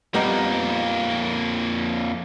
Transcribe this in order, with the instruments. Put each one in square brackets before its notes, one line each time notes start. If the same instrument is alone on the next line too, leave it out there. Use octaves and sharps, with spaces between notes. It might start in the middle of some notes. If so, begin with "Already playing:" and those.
[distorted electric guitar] F2 A#3 [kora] G3 B3 D#4